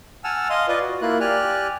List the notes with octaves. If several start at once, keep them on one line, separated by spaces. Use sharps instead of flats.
F#5 G#5 A5 E6 F6
D#5 F5 C6
F4 B4 D5 D#5
F#4
A#3 E4 F4 F#6
G4 D5 G#5 F6 F#6